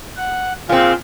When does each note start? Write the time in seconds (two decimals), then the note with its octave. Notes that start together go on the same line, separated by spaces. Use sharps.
0.17 F#5
0.69 A#2 C4 F4 G#4 F5